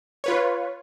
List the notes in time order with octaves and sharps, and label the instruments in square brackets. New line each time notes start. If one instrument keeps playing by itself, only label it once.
[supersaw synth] F4 B4 C#5